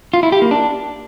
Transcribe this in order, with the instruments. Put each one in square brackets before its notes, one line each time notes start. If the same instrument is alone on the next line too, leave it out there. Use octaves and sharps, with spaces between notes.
[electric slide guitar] F4
E4
G4
A#3
D4